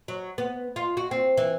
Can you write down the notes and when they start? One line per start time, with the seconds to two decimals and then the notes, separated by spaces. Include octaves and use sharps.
0.08 F#3
0.38 B3
0.76 F4
0.97 F#4
1.11 C4
1.37 E3